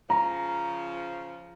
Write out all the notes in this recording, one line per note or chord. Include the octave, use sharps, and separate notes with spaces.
C#3 F3 A#5